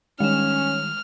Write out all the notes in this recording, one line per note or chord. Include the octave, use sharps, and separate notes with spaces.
D#3 G3 G#3 C#4 F6 E7